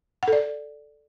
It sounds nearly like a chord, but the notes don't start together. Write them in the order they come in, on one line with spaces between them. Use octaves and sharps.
F#5 A4 D5